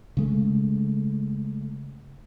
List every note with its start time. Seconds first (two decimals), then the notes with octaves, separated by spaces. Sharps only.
0.17 C#3 G#3 A3